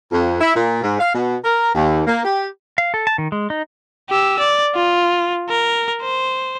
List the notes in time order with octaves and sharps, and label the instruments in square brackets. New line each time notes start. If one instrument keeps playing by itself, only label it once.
[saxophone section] F2
E4
A#2
G#2
F5
B2
A#4
D#2
A#3
G4
[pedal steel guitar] F5
A4
A5
D#3
G#3
D#4
[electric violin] G4 E6
D5
F4
A#4
C5